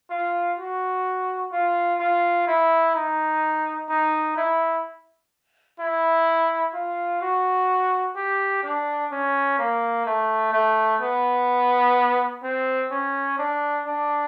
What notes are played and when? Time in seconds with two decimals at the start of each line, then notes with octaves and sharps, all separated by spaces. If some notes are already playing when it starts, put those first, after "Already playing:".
0.10 F4
0.58 F#4
1.52 F4
2.00 F4
2.47 E4
2.95 D#4
3.89 D#4
4.37 E4
5.80 E4
6.74 F4
7.22 F#4
8.16 G4
8.63 D4
9.12 C#4
9.59 A#3
10.06 A3
10.53 A3
11.01 B3
12.43 C4
12.91 C#4
13.38 D4
13.86 D4